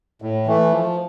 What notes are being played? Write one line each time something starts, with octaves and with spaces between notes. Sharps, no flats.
A2
E3 A3
F3